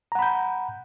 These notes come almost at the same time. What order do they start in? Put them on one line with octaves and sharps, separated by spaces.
A#5 F#5 B5 G6